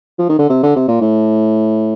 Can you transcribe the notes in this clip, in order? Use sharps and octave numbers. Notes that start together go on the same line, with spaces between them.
F3
D#3
D3
C3
D3
C3
A#2
A2